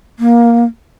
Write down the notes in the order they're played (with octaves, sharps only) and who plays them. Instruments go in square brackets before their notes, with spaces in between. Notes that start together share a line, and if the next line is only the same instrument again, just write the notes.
[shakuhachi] A#3